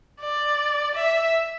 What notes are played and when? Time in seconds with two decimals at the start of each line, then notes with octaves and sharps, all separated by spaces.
0.20 D5
0.95 E5